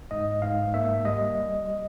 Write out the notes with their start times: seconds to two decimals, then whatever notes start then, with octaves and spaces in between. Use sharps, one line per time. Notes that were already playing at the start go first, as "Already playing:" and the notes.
0.11 G#2 D#5
0.42 G#2 F5
0.74 A#3 E5
1.05 G3 D#5